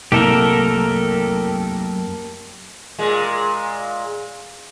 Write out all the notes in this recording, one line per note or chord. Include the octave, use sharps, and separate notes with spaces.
C2 F#2 A3 A#3 G4 A4 A#4
A#2 G#3